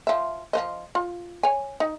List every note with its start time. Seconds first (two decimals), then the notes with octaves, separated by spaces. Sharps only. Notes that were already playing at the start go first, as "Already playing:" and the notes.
0.07 F3 E5
0.53 F3 C5 D#5
0.95 F4
1.43 C#5 G#5
1.80 D#4